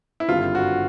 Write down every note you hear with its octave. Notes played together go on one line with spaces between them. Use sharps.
E4
G#1 G2 D3 F4
F#4